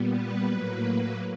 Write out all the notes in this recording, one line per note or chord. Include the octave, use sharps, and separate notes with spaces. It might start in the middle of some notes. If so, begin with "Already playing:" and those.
Already playing: A#2 G3 B3
B4
A2 F#3 A#3